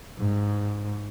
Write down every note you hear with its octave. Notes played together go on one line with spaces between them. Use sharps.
G#2